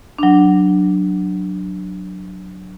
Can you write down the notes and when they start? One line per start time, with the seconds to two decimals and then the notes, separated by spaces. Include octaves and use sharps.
0.19 F#3 D4